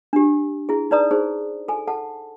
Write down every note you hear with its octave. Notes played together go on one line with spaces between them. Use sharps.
D4 G4
E4 G#4
D#4 B4 D5 A#5 D#6
D#4 G#4 C5
A4 G#5
A4 F#5 A5